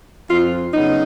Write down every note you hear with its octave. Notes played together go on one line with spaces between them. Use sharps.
F2 F4
C#3 F#3 B3 D#4